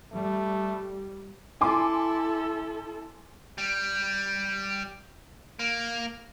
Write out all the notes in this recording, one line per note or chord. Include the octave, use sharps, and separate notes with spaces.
G3 A3
E4 A4 G#5 C6 D6
G3
A#3